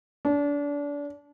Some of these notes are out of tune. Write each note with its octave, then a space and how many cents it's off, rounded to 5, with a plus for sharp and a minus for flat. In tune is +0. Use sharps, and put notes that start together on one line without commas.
D4 -30